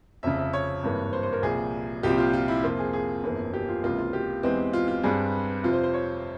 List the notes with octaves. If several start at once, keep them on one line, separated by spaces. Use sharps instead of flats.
F1 F2 C#3 E5
E5
C#5
G#1 G2 E3 A#3
C5
C5
A#4
C2 A#2 F3 G#4
C2 A#2 F3 C4 G4
F4
F4
E4
F2 C3 F3 A#3 F4
G#4
G#4
G1 F2 E3 A#3
G4
F4
C#2 C3 E3 A#3 F4
F4
G4
E2 E3 G#3 C4
F4
F4
G2 G3 C4 G#4
F2 C3 F3 F4
C5
C5
C#5